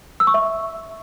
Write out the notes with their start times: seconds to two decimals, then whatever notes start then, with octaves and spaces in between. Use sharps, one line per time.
0.20 E6
0.27 C#6
0.34 E5